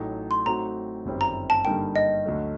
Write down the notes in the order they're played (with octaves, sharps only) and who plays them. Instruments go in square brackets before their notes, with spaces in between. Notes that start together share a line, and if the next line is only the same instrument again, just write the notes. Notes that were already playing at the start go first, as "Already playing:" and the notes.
Already playing: [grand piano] A1 A2 F#3 A3 D#4
[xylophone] C6
[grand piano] A2 F#3 C4 D#4 F#4 [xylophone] A#5
[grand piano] G1 F#2 D#3 G3 C4
[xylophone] A#5
A5
[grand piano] G2 D3 G3 A#3 D#4 [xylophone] G5
[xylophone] D#5
[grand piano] D2 D3 F#3 A3